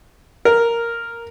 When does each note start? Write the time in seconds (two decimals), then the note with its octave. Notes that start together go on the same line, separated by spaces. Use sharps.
0.45 A#4